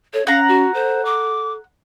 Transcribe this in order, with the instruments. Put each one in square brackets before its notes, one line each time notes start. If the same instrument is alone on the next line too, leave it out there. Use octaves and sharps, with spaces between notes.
[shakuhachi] A4 [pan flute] C#5
[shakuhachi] C#4 [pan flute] F5 [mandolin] F#5 A#5
[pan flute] F#4
[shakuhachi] A4 [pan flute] C5
[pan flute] D6